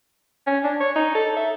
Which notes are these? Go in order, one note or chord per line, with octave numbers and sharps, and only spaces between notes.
C#4
D4
C#5
D#4
A4
E5